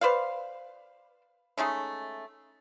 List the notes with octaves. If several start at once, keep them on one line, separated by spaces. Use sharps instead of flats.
B4 C5 D5 F5
G#3 A3 C#4 D#4